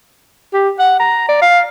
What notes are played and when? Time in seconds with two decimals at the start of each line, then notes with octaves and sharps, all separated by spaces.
0.53 G4
0.79 F#5
0.99 A#5
1.29 D5
1.42 F5